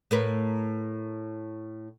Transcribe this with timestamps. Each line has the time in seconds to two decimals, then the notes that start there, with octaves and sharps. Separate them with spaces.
0.11 A2 A#4 B4